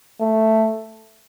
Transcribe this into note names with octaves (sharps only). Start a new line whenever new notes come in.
A3